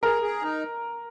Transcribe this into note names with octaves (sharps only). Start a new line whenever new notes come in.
G#4 A#4
G#4
D#4